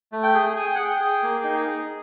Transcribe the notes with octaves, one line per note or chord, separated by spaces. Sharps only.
A3
G5
G#4
G#4 G#5
G5
G#4 F#5
G5
G#4
A#3
D#4
G#4